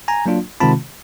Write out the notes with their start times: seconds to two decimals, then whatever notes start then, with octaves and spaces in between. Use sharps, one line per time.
0.08 G#5 A#5
0.26 F#3 A#3 D4 F4
0.60 C3 D#3 G#3 C4 F4 A5 B5